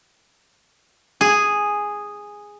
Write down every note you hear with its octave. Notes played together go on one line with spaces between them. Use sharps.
G#4